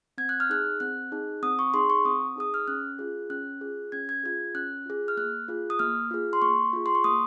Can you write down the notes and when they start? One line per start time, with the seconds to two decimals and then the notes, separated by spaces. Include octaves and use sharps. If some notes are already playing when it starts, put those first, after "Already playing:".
0.18 C4 G#6
0.29 F#6
0.40 F6
0.50 D#4 G#4 F#6
0.80 C4 F#6
1.12 D#4 G#4
1.42 C4 D#6
1.59 C#6
1.74 D#4 G#4 C6
1.90 C#6
2.05 C4 D#6
2.36 D#4 G#4 D#6
2.54 F6
2.68 C#4 F#6
2.99 F4 G#4
3.30 C#4 F#6
3.61 F4 G#4
3.92 C#4 G#6
4.09 G#6
4.23 F4 G#4 G#6
4.55 C#4 F#6
4.86 F4 G#4
5.08 F6
5.17 A#3 F#6
5.48 F4 G#4
5.70 D#6
5.79 A#3 F6
6.11 F4 G#4
6.33 C6
6.42 A#3 C#6
6.73 F4 G#4
6.86 C6
6.95 C#6
7.04 A#3 D#6